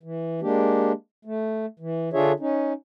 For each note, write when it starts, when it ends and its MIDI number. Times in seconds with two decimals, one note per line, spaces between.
0.03 0.40 52
0.42 0.92 56
0.42 0.92 58
0.42 0.92 62
0.42 0.92 67
1.25 1.66 57
1.80 2.09 52
2.13 2.32 50
2.13 2.32 62
2.13 2.32 65
2.13 2.32 68
2.13 2.32 73
2.13 2.32 76
2.40 2.73 61
2.40 2.73 63